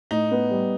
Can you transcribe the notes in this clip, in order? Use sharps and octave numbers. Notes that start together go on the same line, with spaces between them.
A2 D#4
B3
G3